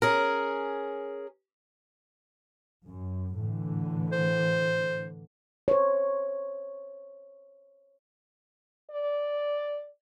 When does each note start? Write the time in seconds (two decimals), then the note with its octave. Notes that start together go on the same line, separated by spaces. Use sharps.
0.02 C#4 G#4 A#4
2.86 F#2
3.36 A2 D3 E3
4.12 C5
5.68 C5 C#5
8.91 D5